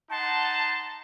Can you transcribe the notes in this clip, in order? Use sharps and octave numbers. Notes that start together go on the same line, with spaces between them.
D#4 F#5 A5 C6